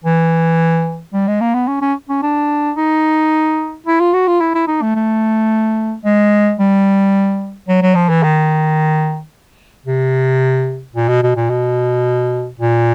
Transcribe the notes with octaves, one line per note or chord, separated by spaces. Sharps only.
E3
G3
G#3
A#3
B3
C#4
C#4
C#4
D4
D#4
E4
F4
F#4
F4
E4
E4
D#4
A3
A3
G#3
G3
F#3
F#3
F3
E3
D#3
C3
A#2
B2
B2
A#2
B2
A#2